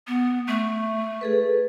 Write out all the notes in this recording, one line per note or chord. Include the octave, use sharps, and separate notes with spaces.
B3
A3
G#4 A4 B4